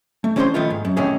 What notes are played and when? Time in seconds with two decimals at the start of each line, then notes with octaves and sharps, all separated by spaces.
0.24 A3
0.36 E3 C#4 D4 G#4 C5 C6
0.54 D#3 F3 A3 B3 F4
0.70 G#2
0.85 F#2
0.96 A2 C3 D#3 E3 C#4 G#4